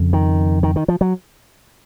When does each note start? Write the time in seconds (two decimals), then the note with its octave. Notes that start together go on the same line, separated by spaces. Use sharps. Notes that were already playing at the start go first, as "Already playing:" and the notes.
Already playing: F2 C#3
0.13 D#3
0.63 D#3
0.76 D#3
0.88 F3
1.01 F#3